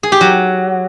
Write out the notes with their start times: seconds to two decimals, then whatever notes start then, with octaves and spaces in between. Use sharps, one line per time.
0.03 G#4
0.12 G4
0.21 F#3